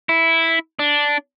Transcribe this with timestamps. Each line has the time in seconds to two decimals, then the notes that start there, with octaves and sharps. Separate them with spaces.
0.09 E4
0.79 D4